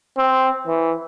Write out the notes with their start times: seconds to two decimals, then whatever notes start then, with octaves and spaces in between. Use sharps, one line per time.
0.17 C4
0.67 E3